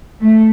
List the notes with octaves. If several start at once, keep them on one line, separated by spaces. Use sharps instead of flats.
A3